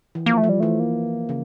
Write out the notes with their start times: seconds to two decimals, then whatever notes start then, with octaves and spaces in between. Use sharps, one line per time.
0.15 E3
0.26 F3 A#3
0.37 A3
0.44 F3
0.49 G3
0.60 E3 A3
0.80 A#3
1.29 C#3